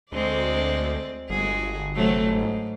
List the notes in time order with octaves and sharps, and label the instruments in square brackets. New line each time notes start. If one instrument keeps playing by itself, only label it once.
[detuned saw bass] D2 [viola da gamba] G#3 C4 D5
[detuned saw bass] G1 [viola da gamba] G#3 F#4 G#4
[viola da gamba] C3 F#3 A3
G#2